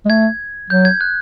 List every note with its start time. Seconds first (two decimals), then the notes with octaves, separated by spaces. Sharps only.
0.05 G#3
0.09 A3 G#6
0.70 F#3 G6
0.85 G#6
1.01 F#6